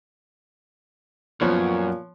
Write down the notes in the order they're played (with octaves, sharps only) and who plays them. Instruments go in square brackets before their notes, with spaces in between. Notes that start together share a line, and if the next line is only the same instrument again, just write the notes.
[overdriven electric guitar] F#2 [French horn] A#2 [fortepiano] F3 B3 C#5